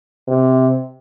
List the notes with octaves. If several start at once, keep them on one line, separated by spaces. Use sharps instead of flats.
C3